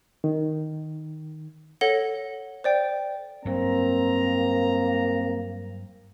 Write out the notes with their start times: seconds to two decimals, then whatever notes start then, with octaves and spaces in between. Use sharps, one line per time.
0.24 D#3
1.81 A4 C#5 F#5 A#6 G7
2.64 C5 D5 G5
3.45 G2 F#3 A#3 C4 A#5